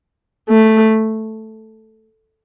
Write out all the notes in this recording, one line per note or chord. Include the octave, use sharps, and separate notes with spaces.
A3